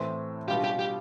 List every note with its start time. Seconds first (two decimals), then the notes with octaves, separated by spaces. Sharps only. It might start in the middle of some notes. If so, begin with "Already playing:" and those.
Already playing: A2 E3 A3 C4
0.48 B2 G3 D4 F4 G4
0.64 G4
0.79 G4